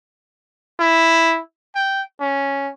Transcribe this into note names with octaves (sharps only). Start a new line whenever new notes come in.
E4
G5
C#4